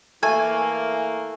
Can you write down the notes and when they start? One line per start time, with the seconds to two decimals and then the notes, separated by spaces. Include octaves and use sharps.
0.23 E3 A3 A#3 G#5